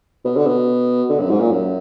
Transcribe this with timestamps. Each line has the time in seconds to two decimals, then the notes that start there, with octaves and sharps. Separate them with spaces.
0.25 B2
0.36 D3
0.47 B2
1.09 D3
1.20 F#2
1.30 G#2
1.41 A#2
1.51 F#2